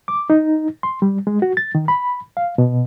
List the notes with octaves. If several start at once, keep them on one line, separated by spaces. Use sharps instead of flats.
D6
D#4
C6
G3
G#3
F#4
A6
D#3
B5
F5
B2